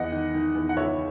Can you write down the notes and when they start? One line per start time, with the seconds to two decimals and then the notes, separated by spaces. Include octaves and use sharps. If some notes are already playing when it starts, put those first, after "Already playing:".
Already playing: E2 D#5 F#5
0.12 D#3
0.34 D#3
0.55 E2
0.69 F#5
0.77 C#2 C#5 E5